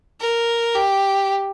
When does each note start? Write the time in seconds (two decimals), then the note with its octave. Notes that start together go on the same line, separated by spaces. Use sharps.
0.20 A#4
0.75 G4